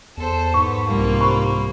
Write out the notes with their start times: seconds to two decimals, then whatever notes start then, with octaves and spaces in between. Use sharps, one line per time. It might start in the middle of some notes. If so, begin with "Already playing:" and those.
0.17 E2 A4 C5
0.54 G#2 B3 C#6
0.87 C2 G3 A#3 F4
1.20 C5 B5 C#6